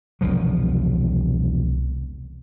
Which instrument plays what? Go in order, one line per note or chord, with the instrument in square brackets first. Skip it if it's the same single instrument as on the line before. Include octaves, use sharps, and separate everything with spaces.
[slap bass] E1 C2 F3 F#3